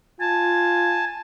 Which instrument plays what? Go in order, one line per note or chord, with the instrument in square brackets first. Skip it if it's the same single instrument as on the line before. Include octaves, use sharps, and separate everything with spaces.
[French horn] F4 [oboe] G#5 [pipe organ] A5